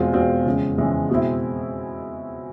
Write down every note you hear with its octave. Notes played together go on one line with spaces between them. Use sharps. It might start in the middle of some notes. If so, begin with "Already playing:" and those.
Already playing: E2 B2 G#3 C4 F4
E2 B2 G#3 C4 F4
F2 C#3 E3 G#3
F2 C#3 E3 G#3
B2 G#3 C4 E4